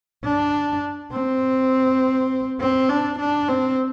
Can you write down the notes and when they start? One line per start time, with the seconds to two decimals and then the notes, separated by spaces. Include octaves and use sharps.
0.24 D4
1.13 C4
2.60 C4
2.89 D4
3.19 D4
3.48 C4